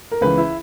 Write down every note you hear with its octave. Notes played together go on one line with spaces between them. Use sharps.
A#4
C#2 C#3 E3 B4
E4